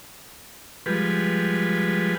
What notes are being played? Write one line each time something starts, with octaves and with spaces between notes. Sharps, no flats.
F3 G3 G#3 B4